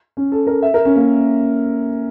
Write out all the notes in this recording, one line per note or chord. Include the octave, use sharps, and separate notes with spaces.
C#4
A4
A#4
E5
A#4
C#4
A#3